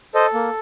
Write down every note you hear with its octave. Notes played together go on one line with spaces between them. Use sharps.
A4 C5 D#5
A#3